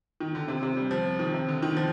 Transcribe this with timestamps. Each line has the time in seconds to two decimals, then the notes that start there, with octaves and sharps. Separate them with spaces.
0.21 D#3
0.35 D3
0.48 C3
0.63 C3
0.77 G3
0.91 F3
1.19 D#3
1.34 C3
1.48 D3
1.63 D#3
1.77 F3